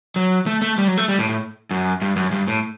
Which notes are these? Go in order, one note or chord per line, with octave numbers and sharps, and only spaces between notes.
F#3
A3
A3
G3
F#3
A3
G3
A2
A2
F#2
G2
F#2
G2
A2